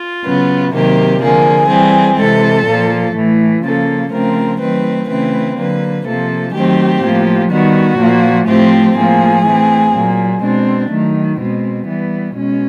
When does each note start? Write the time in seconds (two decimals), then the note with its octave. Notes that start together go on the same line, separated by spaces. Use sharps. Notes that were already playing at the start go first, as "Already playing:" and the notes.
Already playing: F4
0.24 C#3 F#3 B3
0.72 C3 D#3 F#3 A#3 G4
1.21 D3 F3 A#3 G#4
1.69 E3 G3 C4
2.18 C3 E3 G#3 A4
2.66 A#2 F3 A#3
3.14 A2 E3 A3
3.63 C#3 F3 A#3 A4
4.12 C#3 F3 A3 C4 A#4
4.60 D#3 F#3 A3 C4 B4
5.08 C#3 E3 A3 C4 B4
5.57 D3 F#3 A#3 B4
6.06 C3 F3 A#3 A4
6.54 D#3 F#3 A3 C4 G4
7.02 A2 F3 A#3
7.51 D#3 G3 B3 F#4
7.99 A#2 F3 A#3
8.48 A2 F3 A3 C4 G4
8.96 A2 F3 A#3 G#4
9.45 E3 A3 C4
9.94 A#2 F#3 A#3
10.42 B2 G#3 C4 D4
10.90 D#3 F#3 A3
11.39 B2 G#3 C4
11.87 E3 G3 B3
12.35 B2 G#3 C#4